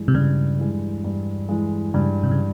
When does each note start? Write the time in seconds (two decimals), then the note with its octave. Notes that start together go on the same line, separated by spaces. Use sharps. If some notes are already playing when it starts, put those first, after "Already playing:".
Already playing: G2 E3 G#3
0.08 C3
0.14 G2 C#3
0.59 E3 G#3
1.04 G2
1.49 E3 G#3
1.94 G2 C#3
2.23 C3
2.31 C#3